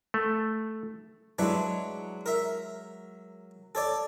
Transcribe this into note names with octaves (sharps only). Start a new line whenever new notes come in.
A3
F#3 G#3 D4 E4 B4
A#4 E5
A4 C#5 D5